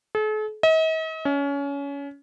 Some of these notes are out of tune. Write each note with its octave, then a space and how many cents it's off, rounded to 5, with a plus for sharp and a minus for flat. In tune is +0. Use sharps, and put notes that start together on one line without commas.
A4 -45
D#5 +45
C#4 +25